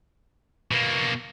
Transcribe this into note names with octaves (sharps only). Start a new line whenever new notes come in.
B2 A#3